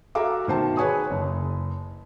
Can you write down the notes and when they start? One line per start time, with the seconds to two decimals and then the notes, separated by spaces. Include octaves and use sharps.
0.15 F#4 A4 E5 F5 A#5 D6
0.47 B2 D#3 C5 A5
0.77 G#4 B4 C#5 G#5 C#6 D#6
1.11 F#1